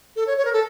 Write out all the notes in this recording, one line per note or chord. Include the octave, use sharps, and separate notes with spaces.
A4
C#5
C#5
A#4
A4